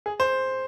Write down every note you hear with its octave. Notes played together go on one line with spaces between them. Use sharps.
G#4
C5